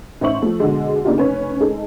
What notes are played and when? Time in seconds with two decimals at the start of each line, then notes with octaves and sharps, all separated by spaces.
0.21 A1 D#4 C5 E5 C#6 F#7
0.42 F3 A3
0.60 B2 D3 G#3
1.05 C#3 A#3 D4 D#4 F4 G4
1.17 F1 C#4 B4 C#5
1.60 G#3 D#4 G#4 A4